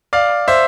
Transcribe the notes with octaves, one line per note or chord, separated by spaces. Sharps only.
D5 F5
C5 E5